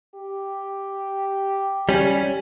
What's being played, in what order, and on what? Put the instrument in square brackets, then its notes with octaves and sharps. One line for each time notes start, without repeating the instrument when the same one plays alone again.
[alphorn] G4
[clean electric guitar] G3 C#4